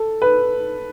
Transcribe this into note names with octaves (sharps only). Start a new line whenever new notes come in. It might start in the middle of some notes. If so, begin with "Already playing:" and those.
Already playing: A4
B4